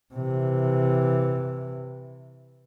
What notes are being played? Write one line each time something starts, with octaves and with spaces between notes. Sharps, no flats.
C3 E3